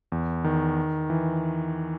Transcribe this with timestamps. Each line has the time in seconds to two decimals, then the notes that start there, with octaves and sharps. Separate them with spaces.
0.12 E2
0.44 D#3
1.10 E3